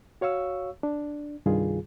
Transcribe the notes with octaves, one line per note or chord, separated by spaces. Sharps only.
F#4 C#5 F5 C#6 E6
D4
C2 G2 D#3 G3 F4 G#4